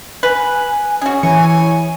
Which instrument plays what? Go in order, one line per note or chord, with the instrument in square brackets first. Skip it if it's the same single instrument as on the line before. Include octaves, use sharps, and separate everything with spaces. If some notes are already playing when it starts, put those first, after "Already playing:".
[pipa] B4 [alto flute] G#5
[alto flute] C#4 [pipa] F#4 G#4
[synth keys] E3 C#6 [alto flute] C#5 [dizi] G#5